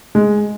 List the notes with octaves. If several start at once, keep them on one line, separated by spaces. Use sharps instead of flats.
G#3